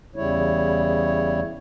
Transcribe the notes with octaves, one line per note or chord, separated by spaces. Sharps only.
E2 C#3 G3 E4 C#5